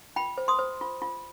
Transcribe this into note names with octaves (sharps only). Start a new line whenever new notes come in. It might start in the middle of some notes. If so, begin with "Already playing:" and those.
F4 G5 B5
C5
C6 D#6
C5
F4
F4